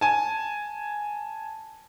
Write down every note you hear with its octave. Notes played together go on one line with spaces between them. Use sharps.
G#5 A5